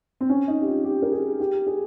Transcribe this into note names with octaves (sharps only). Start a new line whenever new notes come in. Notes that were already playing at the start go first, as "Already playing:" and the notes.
C4
C#4
D#4
G4
F4
G4
A#4
G#4
G4
G#4